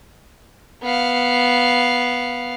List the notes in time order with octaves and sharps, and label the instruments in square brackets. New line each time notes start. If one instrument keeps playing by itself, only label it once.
[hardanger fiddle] B3 F5